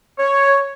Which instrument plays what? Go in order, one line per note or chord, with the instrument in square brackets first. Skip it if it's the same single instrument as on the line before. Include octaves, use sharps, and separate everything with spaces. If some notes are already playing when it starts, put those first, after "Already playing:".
[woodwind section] C#5